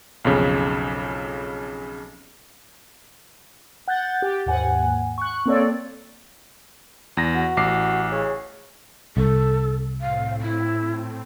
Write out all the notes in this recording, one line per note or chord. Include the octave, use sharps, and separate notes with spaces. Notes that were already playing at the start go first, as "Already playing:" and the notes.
B1 F2 C#3
F#5 F#6 G6 A6
G4
D#2 G#2 F#5 G#5
C#6 F#6
A#3 C4 A4 C#5 D5
E2 A#6
F#4
A1 D6 C7
C#3
C2 A4
A2 A3 C4 F5
E4